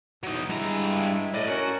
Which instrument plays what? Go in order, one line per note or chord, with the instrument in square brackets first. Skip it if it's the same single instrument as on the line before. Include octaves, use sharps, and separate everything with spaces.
[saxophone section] E2 [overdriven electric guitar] F#3 D#4
[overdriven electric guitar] G2 A#5 [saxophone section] G#3 E4
[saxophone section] A2 [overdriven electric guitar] D5 D#5
[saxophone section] C#4 A#4 [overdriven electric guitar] F#4